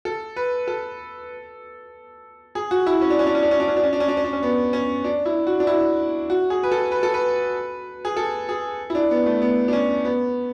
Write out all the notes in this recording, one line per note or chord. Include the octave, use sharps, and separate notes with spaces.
A4
B4
A4
G#4
F#4
E4
C#4
D4
C#4
D4
C#4
D4
C#4
D4
C#4
D4
C#4
D4
C#4
D4
C#4
D4
C#4
B3
C#4
D4
E4
F#4
D4
E4
F#4
G#4
B4
A4
B4
A4
B4
G#4
A4
G#4
E4
D4
B3
A3
B3
D4
C#4
B3